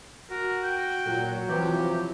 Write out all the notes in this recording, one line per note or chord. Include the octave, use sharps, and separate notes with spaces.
F#4 A#4
G5
A#2 F#3
C3 E3 F3 G4